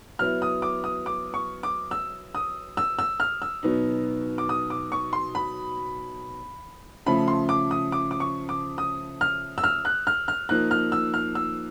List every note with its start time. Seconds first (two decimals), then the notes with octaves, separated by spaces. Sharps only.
0.19 F#3 B3 E4 F6
0.42 D#6
0.62 D6
0.84 D#6
1.06 D6
1.34 C#6
1.63 D6
1.91 E6
2.35 D#6
2.77 E6
2.99 E6
3.20 F6
3.42 E6
3.63 B2 F#3 B3 D#4
4.38 D6
4.49 D#6
4.70 D6
4.92 C#6
5.13 C6
5.35 B5
7.06 C#3 F3 A3 B5
7.28 C6
7.49 D6
7.71 D#6
7.92 D6
8.11 D6
8.20 C#6
8.49 D6
8.78 D#6
9.21 F6
9.58 E6
9.64 F6
9.85 F#6
10.07 F6
10.28 F6
10.49 F3 A#3 D#4 F#6
10.71 F6
10.92 E6
11.14 F6
11.35 E6